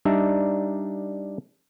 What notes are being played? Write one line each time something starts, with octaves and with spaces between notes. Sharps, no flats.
G3 D4 D#4 E5 A#5